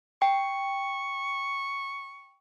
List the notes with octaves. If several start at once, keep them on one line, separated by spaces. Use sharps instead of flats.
G5 C#6